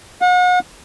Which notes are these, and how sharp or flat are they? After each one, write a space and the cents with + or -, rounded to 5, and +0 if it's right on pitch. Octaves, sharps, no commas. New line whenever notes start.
F#5 -40